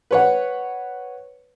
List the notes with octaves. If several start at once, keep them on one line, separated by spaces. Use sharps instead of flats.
B4 C#5 F#5